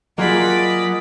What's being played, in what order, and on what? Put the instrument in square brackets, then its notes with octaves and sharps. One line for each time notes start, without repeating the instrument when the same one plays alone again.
[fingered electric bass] F#3 [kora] A#3 F4 G#4 [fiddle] D5 B5 [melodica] D#5 F#5